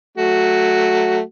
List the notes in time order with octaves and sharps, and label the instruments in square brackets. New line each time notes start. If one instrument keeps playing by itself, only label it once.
[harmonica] F#3 A3 F#4